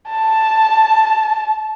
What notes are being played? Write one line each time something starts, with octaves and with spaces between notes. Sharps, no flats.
A5